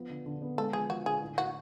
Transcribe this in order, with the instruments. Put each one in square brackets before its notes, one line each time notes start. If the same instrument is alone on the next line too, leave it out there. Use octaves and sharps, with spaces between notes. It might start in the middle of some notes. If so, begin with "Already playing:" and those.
Already playing: [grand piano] F3 B3
D3
D3
B3
[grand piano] G#3 [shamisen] A4
[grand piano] F3 [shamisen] G#4
[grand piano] F3 [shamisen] F#4
[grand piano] D3 [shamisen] G#4
[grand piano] A2
[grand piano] A2 [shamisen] F#4